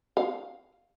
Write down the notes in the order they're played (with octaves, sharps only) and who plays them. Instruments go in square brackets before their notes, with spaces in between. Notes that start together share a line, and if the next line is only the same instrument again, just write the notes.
[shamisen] F5